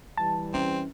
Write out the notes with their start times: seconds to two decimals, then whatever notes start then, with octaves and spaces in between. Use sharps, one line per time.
0.17 E3 G3 A5
0.54 C4 C#4